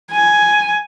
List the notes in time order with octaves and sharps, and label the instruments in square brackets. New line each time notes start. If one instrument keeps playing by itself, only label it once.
[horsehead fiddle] G#5